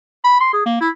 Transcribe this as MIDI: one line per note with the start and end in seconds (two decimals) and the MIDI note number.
0.24 0.41 83
0.41 0.53 84
0.53 0.62 68
0.66 0.78 58
0.81 0.89 64